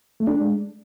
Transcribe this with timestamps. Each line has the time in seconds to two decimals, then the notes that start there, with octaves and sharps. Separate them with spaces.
0.20 A3
0.27 D4
0.34 G#3